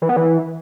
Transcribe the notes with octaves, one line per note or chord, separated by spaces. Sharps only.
E3
B3
E3